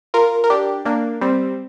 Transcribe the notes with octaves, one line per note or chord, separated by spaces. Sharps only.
F4 A#4
A#4
D4 G4
A#3 D4
G3 C4